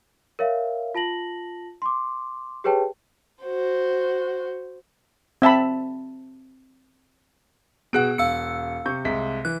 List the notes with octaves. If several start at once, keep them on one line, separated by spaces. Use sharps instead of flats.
A#4 C#5 E5 F5
F4 A5 A#6 F#7
C6 D6
G4 G#4 B4 C#5 G5 A5
F#4 C5
C4 E5 A5 B5
B2 B3 G#4 F#5 F#6 D7
E1 F5 E6 C#7
C3 C#6 G6
C2 G#3 B6
E3 F#6